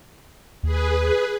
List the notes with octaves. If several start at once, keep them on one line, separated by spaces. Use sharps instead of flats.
D#2 G#4 B4